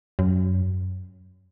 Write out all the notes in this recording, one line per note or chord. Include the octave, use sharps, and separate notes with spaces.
F#2